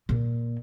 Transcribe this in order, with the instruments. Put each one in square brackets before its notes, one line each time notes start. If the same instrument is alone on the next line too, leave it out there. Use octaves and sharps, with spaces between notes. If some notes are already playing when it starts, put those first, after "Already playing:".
[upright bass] A#2